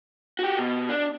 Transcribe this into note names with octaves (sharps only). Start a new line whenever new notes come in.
F#4 G4
B2
D4